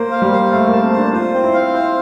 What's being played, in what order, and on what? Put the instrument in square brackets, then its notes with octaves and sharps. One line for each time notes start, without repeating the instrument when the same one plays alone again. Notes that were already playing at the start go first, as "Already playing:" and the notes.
Already playing: [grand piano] A#3 [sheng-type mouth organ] C5
[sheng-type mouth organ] F5
[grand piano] G3
[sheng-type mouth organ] C5
[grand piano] A3 [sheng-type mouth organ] F5
[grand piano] A#3 [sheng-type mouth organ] A5
[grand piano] C4
[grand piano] D4 [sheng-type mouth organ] C5
[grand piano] F4 [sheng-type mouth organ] C5
[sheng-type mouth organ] C4
[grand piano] E4
[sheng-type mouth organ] F5
[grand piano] E4 [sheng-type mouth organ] C5